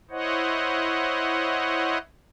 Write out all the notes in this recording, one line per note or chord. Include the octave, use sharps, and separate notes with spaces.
E4 C5 C#5 D#5 F#5